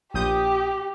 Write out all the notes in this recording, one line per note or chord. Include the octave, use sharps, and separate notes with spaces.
A#1 G4 D#6 G6